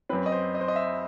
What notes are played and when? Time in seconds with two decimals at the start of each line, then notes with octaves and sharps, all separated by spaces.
0.09 F#2 F#3 C4 B4
0.26 D#5
0.32 C5
0.55 D#5
0.61 C5
0.68 D#5
0.76 E5